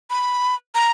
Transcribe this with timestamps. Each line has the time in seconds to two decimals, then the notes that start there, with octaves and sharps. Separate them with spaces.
0.10 B5
0.75 A#5